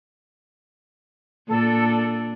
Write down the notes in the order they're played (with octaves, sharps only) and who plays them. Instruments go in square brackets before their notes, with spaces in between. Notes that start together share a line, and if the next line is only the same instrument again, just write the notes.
[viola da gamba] A#2 D4 [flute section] A4